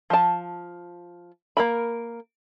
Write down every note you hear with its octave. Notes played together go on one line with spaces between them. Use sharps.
F3 A5
A#3 A#4 B5